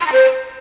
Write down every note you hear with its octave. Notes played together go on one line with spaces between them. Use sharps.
C6
A#5
C5